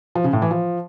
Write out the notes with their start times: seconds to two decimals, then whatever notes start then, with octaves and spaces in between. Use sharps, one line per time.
0.15 F3
0.24 C#3
0.33 A2
0.42 E3
0.51 F3